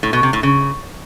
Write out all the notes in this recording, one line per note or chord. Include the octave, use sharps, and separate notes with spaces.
A2
B2
C3
A2
C#3